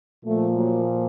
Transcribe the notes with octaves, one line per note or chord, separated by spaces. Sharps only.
A#2 F3 A3
F#3 A#3